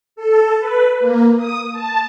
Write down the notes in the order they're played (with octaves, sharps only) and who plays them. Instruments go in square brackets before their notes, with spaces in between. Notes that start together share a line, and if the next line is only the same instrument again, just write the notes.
[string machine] A4
B4
A#3
D#6
A5